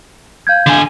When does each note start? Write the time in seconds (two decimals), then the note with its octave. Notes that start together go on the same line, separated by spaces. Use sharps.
0.47 F5 G6 G#6
0.66 D3 G#5